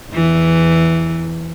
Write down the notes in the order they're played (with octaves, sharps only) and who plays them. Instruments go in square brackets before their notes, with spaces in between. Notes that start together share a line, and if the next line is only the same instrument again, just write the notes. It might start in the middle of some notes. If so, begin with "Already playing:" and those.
[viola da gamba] E2 E3